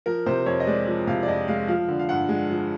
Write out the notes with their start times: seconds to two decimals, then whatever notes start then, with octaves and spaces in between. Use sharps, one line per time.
0.06 F3 A#4
0.26 C3 C5
0.46 F2 C#5
0.60 D#5
0.67 G#3 D5
0.87 F3
1.07 C3 F5
1.23 D5
1.28 F2 D#5
1.48 G#3 F5
1.68 F3 F5
1.88 D3
1.99 F5
2.09 G2 F#5
2.29 G#3
2.50 F3